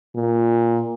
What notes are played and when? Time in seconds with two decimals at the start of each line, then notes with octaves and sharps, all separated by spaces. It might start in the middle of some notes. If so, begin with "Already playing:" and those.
0.15 A#2